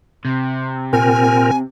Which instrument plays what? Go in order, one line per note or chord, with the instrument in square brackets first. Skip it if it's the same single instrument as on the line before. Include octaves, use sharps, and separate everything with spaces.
[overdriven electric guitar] C3
[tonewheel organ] A#2 C4 A#4 [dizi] G#5